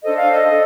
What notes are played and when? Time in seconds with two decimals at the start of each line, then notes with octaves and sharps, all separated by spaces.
0.03 D4 A4 C5 D#5
0.17 F5
0.32 D#5
0.50 D4 A4